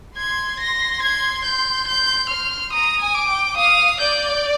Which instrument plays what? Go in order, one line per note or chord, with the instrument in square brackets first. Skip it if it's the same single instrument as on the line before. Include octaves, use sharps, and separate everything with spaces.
[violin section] C6 [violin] G#6
[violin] A#6
G#6
G6
G6
F6
[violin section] A#5 [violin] D#6
[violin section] G#5
[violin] D6
[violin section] G5
[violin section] F5 [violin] D#6
[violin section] D5 [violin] G6